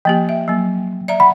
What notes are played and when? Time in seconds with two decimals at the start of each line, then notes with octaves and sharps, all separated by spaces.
0.05 F3 A#3 G4 G5
0.29 E5
0.48 F#3 A#3
1.08 D5 E5 A#5
1.20 F#5 B5